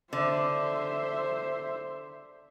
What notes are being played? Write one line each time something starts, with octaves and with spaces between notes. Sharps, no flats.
D3 C5 E5